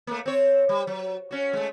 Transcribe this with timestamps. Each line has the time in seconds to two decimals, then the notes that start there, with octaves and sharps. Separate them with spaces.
0.07 A3 A#3
0.26 C4 C#5
0.69 G3
0.87 F#3
1.31 C#4 F#4
1.53 G#3 A3